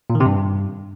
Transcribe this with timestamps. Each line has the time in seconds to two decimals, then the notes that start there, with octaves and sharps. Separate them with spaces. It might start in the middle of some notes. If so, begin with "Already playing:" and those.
0.10 A#2
0.15 D#3
0.20 C3
0.26 G2